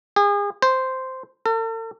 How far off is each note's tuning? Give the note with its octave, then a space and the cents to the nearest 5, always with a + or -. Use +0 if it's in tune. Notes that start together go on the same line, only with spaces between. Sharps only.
G#4 -35
C5 -5
A4 +45